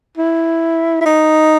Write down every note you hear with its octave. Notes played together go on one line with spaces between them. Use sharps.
E4
E4
D#4